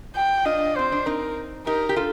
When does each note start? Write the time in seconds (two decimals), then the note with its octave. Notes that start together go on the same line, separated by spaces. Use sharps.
0.16 G5
0.45 D4 F4 D#5
0.76 C4 C5
0.92 D4
1.06 C4 D#4 A#4
1.67 D#4 G4 A#4
1.89 G4
1.96 F4 A4